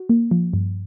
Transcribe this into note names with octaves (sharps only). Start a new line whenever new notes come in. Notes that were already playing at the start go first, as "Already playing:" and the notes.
Already playing: F#4
A#3
F3
G2